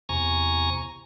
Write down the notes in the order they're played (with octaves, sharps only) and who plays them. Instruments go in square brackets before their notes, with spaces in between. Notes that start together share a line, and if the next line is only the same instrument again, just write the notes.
[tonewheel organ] E2 C3 G#5 A#5 C#6